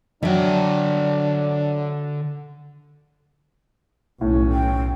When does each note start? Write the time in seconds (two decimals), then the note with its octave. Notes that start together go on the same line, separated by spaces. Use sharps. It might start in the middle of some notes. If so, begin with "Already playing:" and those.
0.23 D3 F#3 D4 E5 G5
4.21 B1 A2 C#4
4.52 G5